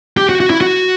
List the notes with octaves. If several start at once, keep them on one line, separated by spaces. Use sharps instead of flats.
G4
F#4
F#4
E4
F#4